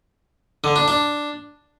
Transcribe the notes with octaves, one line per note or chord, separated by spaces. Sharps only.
D3
D4
D4